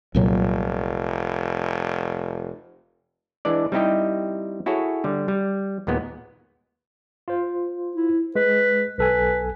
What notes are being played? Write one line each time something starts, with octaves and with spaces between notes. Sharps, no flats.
F1 C2 A#2 F#3
E3 G#3 D4 D5
G3 C4 D#4 E4 G4 D#5
E4 F#4 G#4 A4 C#5
D3 G3
G3
D#2 A#2 G#3 B3
F4 C5
E4
G#3 B4
B1 A4 B4 G#5